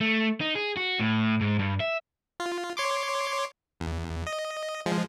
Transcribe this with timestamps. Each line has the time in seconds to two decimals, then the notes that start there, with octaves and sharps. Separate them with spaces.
0.01 A3
0.41 D#4
0.55 G#4
0.77 F#4
1.00 A2
1.41 G#2
1.59 G2
1.80 E5
2.40 F4
2.77 C#5 C6 D6
3.80 E2
4.27 D#5
4.86 F3 G#3